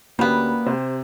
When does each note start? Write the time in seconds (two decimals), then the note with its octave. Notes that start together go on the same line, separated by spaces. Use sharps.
0.19 D2 G3 A#3 B3 C#4 G4
0.66 C3 G4 C5